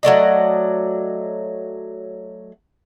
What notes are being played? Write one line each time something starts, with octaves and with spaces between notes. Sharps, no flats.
F#3 A3 D5 D#5